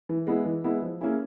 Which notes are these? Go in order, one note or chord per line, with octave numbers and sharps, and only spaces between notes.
E3
G#3 B3 E4
E3
G#3 B3 E4
F3
A#3 C#4 E4 G#4